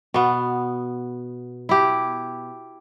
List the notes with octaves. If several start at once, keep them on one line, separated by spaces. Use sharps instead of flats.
B2 B3
E4 G4